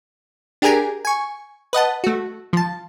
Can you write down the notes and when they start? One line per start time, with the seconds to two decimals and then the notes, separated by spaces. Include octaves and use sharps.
0.62 D4 G4 G#4 A#4 G#5 A#5
1.05 G#5 C#6
1.73 B4 D#5 F#5 A5
2.04 A3 F#4
2.53 F3 A5